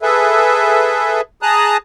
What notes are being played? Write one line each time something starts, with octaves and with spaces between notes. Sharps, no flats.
G#4 A4 B4 E5
G#4 A5 A#5 D#6 F#6